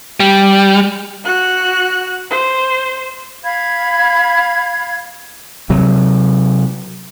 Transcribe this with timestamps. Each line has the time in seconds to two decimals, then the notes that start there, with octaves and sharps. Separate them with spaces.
0.20 G3
1.25 F#4 F#6
2.30 C5
3.44 F5 B5 G#6
5.70 C3 F#3